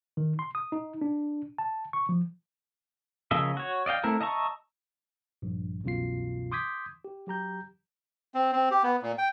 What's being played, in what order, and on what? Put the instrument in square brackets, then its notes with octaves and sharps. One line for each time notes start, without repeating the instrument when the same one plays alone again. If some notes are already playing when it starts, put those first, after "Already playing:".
[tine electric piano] D#3
C6
D#6
D#4
D4
A5
C#6
F3
[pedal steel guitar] C#3 F3 A#3 D#5 E5
F#4 C#5
D5 D#5 F5 G5
A3 C4 E4 A#4
D#5 E5 A5 A#5 C#6
[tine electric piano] A#1 G2
C2 F#2 B2 E3 F4 C7
C6 D6 D#6 G6 G#6 B6
G4
F#3 G4 A#5 G6
[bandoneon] C4
C4
G4
B3
A#2
G5